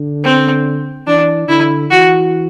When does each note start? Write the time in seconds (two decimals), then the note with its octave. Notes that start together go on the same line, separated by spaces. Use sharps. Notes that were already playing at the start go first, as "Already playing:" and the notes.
Already playing: D3
0.24 C4
1.07 E3 D4
1.48 D3 E4
1.91 E3 F#4